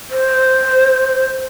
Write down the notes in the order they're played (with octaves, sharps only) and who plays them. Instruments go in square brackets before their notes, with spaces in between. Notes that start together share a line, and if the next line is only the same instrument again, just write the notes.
[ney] C5